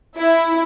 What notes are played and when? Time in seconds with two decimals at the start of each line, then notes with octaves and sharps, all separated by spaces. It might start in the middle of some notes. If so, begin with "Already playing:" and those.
0.18 E4